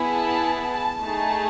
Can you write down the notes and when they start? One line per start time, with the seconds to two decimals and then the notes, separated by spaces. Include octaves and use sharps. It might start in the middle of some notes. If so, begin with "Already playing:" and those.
Already playing: B3 E4 G#4
0.11 A5
0.72 A5
1.04 A3 D#4 G#4 A5